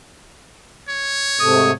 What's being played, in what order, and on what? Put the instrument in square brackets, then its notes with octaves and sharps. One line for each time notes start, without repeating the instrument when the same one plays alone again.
[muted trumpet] C#5
[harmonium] G#2 C3 A3 [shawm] D#6